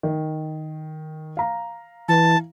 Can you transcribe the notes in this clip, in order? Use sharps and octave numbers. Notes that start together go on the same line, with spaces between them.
D#3
F5 A#5
E3 A5